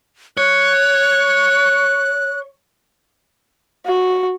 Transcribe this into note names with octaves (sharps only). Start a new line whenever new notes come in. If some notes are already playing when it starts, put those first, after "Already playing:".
C#5 F#6
F#4